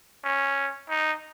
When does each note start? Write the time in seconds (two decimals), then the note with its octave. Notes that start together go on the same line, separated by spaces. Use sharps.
0.24 C#4
0.90 D#4